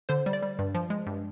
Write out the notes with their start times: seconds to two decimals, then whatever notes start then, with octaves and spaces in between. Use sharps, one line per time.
0.09 D3 C5
0.26 G3
0.33 D5
0.42 G3
0.59 G2
0.75 F3
0.90 G#3
1.06 G2